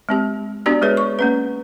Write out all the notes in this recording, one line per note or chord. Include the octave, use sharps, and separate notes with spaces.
G#3 C4 G4
B3 D4 F#4 G4 D5
G#3 G#4 B4 C#5
C#6
A#3 C#4 B4